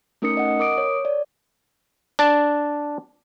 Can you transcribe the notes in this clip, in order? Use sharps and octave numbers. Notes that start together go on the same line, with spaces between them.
A3 C#4 D#4 A#4 D#6 C#7
D#5 F#5
A#4 D6 D#6 D7
C#5
D5
D4 A5